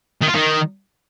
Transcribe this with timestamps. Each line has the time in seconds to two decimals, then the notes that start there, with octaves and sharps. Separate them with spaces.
0.22 D#3
0.28 F4
0.35 D#3